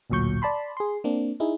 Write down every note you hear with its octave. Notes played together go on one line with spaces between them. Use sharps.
A1 D2 A#2 F#3 C#6 G6
D5 A5 B5 C6
G#4 C6
A#3 C4 D4
D#4 E4 G#4